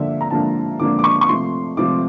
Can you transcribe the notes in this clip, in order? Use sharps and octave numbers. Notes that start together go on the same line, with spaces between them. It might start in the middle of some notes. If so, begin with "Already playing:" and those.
Already playing: D3 F3 A#3 D4 E5
A#5
D3 F3 A#3 D4 A5
D3 F3 A#3 D4 D6
D6
C#6
C#6
C3 F3 A3 C6
C3 F3 A3 D6